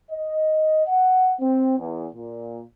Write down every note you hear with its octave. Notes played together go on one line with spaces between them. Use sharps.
D#5
F#5
C4
E2
A#2